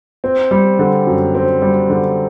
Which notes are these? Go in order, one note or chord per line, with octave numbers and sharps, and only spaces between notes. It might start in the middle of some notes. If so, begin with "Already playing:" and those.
C4
G3
D3
F#2
C4
G3
D3